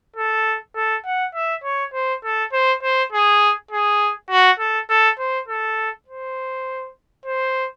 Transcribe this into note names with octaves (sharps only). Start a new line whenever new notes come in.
A4
A4
F#5
E5
C#5
C5
A4
C5
C5
G#4
G#4
F#4
A4
A4
C5
A4
C5
C5